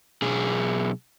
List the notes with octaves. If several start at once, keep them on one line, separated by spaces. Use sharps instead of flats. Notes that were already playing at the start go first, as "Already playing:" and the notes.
B1 G#4